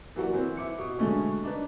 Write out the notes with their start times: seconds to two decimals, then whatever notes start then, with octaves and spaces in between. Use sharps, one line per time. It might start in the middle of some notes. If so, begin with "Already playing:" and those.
0.16 E3 F#3 A#3 F#4 B4 D5
0.33 E3 C4
0.57 E4 D6 C#7
0.78 B2
0.99 D3 F#3 G#3 A3 C#4
1.43 D4 D#4 B4